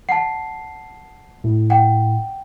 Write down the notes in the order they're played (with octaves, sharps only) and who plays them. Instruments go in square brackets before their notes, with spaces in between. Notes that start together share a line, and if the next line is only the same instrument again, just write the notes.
[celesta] F#5 A5 [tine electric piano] C7
[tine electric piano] A2
[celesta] F#5 G5